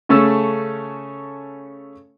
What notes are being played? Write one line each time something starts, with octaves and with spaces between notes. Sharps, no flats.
C#3 A3 C#4 A4 E6